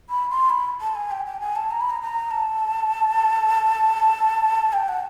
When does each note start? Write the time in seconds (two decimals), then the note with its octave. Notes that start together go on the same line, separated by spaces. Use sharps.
0.10 B5
0.30 C6
0.50 B5
0.81 A5
0.95 G#5
1.11 G5
1.26 G5
1.40 G#5
1.56 A5
1.71 A#5
1.81 B5
1.90 A#5
2.01 A#5
2.31 A5
4.73 G5
4.88 F#5